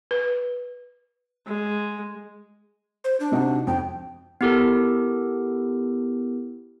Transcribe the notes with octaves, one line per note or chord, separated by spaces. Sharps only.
B4
G#3
C5
D4
C3 D#4 F#4
F2 G5
B3 E4 G4 A4 A#4